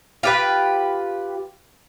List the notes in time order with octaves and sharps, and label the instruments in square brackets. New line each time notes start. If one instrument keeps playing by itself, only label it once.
[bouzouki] F4 G4 B4